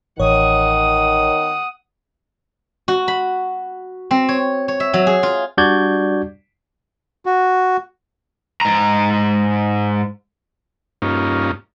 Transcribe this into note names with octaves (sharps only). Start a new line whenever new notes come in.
A1 D#3 C#5 F#5 D#6
F#4
B5
C4
C#5
C#5
E5
F#3
G#4
F4
G3 D4 F#4 D5 G6 G#6
F#4
G#2 A#5
G2 A#3 C#4 D#4 F4